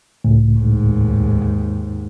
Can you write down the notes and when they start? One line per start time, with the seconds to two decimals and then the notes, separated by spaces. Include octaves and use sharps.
0.24 C#2 A2
0.57 D#2 G#2